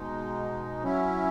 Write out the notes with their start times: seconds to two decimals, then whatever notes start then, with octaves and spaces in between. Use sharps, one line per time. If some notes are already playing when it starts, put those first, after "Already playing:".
Already playing: B2 G#3 D#4
0.83 F#3 C#4 E4